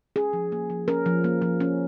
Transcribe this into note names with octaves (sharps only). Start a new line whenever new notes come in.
C#4 G#4
F3
A#3
F3
C#4 A#4
F3
A#3
F3
C#4